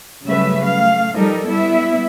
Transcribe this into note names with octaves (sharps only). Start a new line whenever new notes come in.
C#3 F#3 G3 A3 B4 E5
A3 F5
F3 G3 D#4 A4 A#4
G3 B3 E4 E5